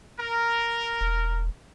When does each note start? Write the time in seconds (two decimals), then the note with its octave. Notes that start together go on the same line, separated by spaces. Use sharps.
0.20 A#4
1.01 E1